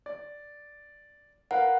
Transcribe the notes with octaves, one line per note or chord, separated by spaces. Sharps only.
D5
A#4 B4 F5 F#5